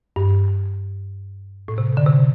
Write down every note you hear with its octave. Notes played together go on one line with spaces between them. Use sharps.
G2
A2
C3
D3
C3